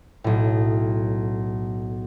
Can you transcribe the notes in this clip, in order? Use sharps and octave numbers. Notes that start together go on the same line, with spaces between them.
B1 A2